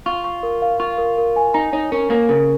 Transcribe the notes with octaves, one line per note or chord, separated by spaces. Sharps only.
F4 C#6
C#6
A#4
F5
F4 C#6
A#4
A#4
G#5
D#4 A#5
D#4 C#5
C#4 A#4
A#3 A#4
C#3 A#4